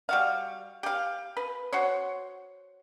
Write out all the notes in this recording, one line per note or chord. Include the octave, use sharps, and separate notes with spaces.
G3 F#4 F5
G4 F5
B4
F#4 C5 C#5